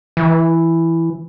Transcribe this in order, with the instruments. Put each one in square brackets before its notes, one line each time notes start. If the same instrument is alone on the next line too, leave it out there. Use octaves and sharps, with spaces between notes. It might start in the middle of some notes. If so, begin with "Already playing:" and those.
[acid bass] E3